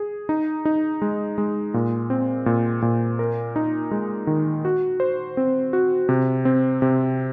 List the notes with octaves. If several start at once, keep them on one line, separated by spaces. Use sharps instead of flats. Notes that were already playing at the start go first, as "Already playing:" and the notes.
Already playing: G#4
D#4
D#4
G#3
G#3
A#2
C4
A#2
A#2
A#4
D#4
G#3
D#3
F#4
C5
C4
F#4
C3
C4
C3